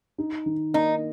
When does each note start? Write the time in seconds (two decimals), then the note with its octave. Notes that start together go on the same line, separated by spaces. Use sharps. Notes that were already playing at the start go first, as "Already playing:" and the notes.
0.18 D#4
0.46 D#3
0.74 A#3 D#4